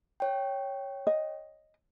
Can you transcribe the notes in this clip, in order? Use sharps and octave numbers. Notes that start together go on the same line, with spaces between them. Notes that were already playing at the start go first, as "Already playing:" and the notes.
C#5 G5
D#5